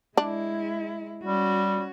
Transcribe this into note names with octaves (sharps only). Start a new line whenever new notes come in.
G#3 D4 E4
G3 C#4 F#4